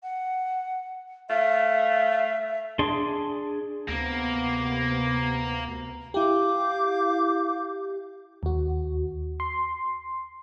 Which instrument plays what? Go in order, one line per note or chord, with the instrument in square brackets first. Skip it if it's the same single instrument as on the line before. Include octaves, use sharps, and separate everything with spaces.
[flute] F#5
[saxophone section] A3 F5 [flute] E5
[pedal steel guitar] D4 G#4 D5 C6
[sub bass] D2 [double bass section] C3 B3 [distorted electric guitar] A#3
[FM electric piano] E4 G4 [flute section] F5 D6 G6
[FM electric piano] D#2 F#4
C6